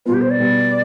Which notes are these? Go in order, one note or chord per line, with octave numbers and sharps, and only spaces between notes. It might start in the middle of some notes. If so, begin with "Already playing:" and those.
B2 G3 B3 F4
G4
C5
D5
B2 G3 B3